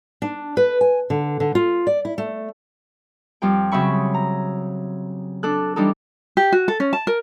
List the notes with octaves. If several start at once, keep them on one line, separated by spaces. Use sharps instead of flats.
D4
B4
G#5
D3
D3
F4
D5
E4
A3
F2 G3 F4 G5
C#3 F#3 C4 E5 B5 C#6
A#5
D4 A4 F#6
E3 G3 D4 D#4 A4
G4
F#4
A4
C#4
A5
A#4